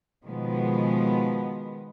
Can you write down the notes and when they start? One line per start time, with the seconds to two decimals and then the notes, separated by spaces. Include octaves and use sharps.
0.24 B2 D#3 F3 G#3 B3